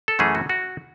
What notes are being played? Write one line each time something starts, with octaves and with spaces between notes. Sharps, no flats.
A4
F#2 E3 A3 C#4 G#4
F#4
F#4